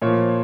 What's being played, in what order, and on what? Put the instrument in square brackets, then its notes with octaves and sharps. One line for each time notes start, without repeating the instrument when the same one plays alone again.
[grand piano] A#2 F3 C#5